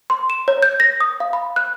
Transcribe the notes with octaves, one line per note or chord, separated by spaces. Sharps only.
C6
E7
C#5
G6
A#6
D#6
F5
B5
F#6